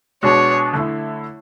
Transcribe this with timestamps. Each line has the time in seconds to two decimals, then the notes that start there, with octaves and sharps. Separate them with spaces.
0.23 B2 G#3 D4 F#4 C#5
0.73 D3 A3 E4